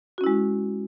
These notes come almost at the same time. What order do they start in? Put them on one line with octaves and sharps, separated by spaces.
F#4 C#4 E4 G#3